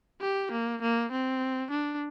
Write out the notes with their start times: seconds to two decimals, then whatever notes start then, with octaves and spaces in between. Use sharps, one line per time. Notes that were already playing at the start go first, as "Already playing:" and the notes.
0.21 G4
0.52 A#3
0.82 A#3
1.12 C4
1.71 D4